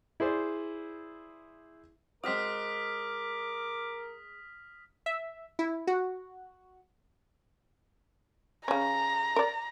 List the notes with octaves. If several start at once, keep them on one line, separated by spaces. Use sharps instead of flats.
E4 G#4 C5 D5
G#3 C4 F#4 A#4 D6 D#6 F6 B6
E5
E4
F#4
C#3 C#4 A#5
A#4 D5